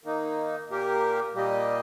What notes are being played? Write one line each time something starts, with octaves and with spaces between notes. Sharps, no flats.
D#3 A#3 D#4
A#2 A#3 G4 A#4
A#2 G3 A#3 G4 D#5